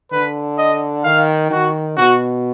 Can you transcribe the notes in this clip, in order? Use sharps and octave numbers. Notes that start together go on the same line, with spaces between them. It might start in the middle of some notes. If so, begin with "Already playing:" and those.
D3 B4
D#5
D#3 F5
D#3 F#4
B2 F#4